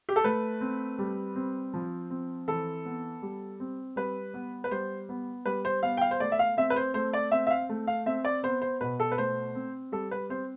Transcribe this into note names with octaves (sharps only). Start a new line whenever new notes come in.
G4
A4
A3 B4
C4
G3
C4
F3
C4
E3 A4
B3
G3
C4
G3 B4
B3
B4
G3 C5
B3
G3 B4
C5
B3 F5
G5
F5
C5
A3 D5
E5
F5
C4 E5
B4
C5
A3 C5
D5
C4 E5
E5
F5
A3
F5
C4 E5
D5
B3 C5
C5
B2 B4
A4
B4
A3 C5
C4
G3 A4
B4
C4 C5